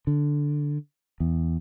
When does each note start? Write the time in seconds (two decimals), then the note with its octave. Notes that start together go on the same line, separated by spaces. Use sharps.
0.07 D3
1.20 E2